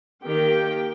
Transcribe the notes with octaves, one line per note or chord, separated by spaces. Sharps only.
D#3 A#3 G4 G5